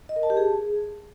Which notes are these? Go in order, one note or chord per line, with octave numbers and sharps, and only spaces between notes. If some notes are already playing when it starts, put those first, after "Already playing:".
D#5
A#4
A5
G4
G#4